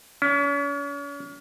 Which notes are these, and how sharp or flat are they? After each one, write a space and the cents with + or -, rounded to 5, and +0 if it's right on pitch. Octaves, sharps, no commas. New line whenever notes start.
C#4 +40